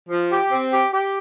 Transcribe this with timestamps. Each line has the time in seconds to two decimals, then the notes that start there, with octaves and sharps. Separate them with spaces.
0.10 F3
0.30 G4
0.50 C4
0.71 G4
0.92 G4